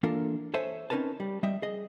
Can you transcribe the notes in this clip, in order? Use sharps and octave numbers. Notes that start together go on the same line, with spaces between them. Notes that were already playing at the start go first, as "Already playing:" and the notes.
E3 A#3 D4 F4 A4 A#4
A4 C5 C#5 E5 G#5 A5
C4 C#4 D#4 A#4 B4 A5
G3
G3 D#5 E5 G5
G#4 D#5